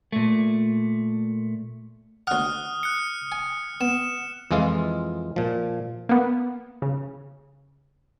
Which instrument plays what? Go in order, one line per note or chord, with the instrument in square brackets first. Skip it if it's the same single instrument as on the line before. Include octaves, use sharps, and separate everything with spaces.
[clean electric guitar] A#2 A3
[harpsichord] D2 F#5 [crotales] D#6 F6 F#6
[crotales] F#6 C#7
[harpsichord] G#5
[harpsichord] B3 [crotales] E7
[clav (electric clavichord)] F2 E3 G#3 F4 F5
A#2 F3
[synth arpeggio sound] A#3 B3
C#3